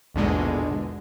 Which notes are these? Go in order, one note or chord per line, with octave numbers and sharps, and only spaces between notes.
A#1 E2 G#2 B2 D3 G#3